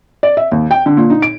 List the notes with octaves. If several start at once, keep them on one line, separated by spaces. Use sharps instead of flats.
D5
E5
D#2
G5
D3
A#2
D#4
D7